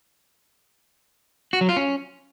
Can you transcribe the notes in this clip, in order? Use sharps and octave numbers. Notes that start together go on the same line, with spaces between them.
F#4
F#3
F4
C#4